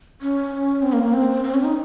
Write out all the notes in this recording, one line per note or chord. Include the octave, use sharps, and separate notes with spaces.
C#4
C4
A#3
A#3
C4
C4
C#4
D#4